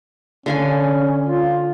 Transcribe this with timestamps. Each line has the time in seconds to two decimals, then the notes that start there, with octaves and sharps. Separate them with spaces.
0.46 D3 C#4 F5 G#5
1.26 F4